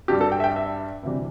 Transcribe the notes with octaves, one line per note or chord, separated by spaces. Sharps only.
G2 G3 G4
A4
G5
E5
G5
E5
D2 C3 E3 G3